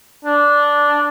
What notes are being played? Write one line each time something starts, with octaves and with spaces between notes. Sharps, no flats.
D4